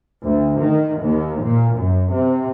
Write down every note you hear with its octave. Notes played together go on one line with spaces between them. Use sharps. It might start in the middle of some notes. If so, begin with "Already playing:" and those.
D2
D#3
D#2
A#2
F#2
C3